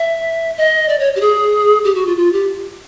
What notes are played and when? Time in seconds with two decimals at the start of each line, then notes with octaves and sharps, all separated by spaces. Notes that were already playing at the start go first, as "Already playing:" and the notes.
Already playing: E5
0.57 D#5
0.89 D5
0.99 C#5
1.16 G4
1.21 G#4
1.84 G4
1.95 F#4
2.07 F4
2.17 F4
2.33 G4